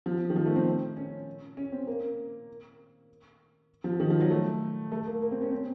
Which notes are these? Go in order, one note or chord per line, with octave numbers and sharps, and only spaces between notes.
F3
D#3
F3
A3
C4
C#4
C#4
C4
A#3
F3
D#3
F3
F#3
A3
A3
A#3
A#3
C4
C#4
C4